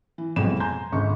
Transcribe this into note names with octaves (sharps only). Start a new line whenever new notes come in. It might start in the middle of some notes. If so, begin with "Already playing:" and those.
E3
A1 F2 B2 F#3 G#3 E7
G#5 A#5 C6 G6
G#1 C#2 D3 C#6